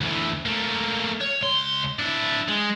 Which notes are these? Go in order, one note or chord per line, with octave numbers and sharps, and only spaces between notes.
D2 E3
A3 A#3
C#5
C#2 C6
D4 E4
G#3